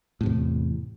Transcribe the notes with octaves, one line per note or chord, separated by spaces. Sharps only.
E2 A2 C3